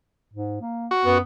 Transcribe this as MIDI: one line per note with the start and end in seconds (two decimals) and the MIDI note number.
0.33 0.61 44
0.61 0.87 58
0.91 1.18 66
1.05 1.20 42
1.05 1.18 59